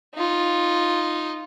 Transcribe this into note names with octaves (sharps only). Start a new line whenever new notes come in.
D#4 F4